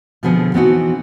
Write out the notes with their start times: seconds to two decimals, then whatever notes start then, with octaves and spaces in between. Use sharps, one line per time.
0.23 B2 D3 F3 B3 C4 G#4
0.54 E3 B3 C4 D#4 F#4